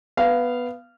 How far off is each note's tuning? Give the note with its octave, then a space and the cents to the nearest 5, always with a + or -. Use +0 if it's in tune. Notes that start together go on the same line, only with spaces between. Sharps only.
B3 +0 F5 -15